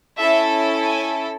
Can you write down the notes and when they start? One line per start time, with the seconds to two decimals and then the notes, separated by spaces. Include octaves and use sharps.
0.18 C#4 E4 A4 E5
0.84 G#5